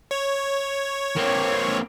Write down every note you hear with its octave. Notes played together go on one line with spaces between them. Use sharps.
C#5
A#3 C4